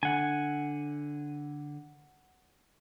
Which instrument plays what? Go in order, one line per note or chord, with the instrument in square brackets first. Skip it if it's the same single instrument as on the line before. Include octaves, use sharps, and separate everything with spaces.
[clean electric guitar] D3 [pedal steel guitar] F#5 G#5